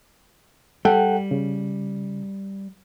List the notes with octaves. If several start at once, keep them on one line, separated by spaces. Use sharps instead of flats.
G3 A4 F#5 G5
C#3